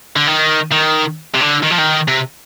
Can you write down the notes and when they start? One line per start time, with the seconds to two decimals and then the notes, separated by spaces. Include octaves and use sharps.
0.16 D3
0.27 D#3
0.72 D#3
1.34 C3
1.41 D3
1.63 D#3
1.71 F3
1.78 D#3
2.08 C3